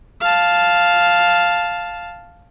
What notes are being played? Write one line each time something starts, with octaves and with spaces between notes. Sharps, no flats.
F5 A5